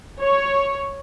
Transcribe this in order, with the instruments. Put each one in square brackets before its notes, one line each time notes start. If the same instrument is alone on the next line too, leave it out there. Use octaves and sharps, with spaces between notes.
[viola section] C#5